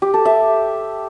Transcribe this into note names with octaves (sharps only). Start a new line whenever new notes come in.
G4
A4
E5